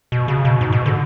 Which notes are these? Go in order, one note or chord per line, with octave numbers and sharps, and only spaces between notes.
B2
C#3
B2
G#2
B2
D3